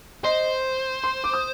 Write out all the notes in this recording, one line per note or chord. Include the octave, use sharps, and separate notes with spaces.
C5 D#5
C6
D6
D#6